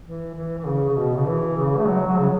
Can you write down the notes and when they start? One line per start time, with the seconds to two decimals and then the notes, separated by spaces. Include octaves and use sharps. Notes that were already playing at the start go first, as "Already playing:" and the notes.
0.04 E3
0.35 E3
0.59 E3
0.66 C#3
0.89 C#3
0.96 B2
1.17 C#3
1.27 E3
1.57 C#3
1.78 A3
1.87 F#3
2.07 F#3
2.18 C#3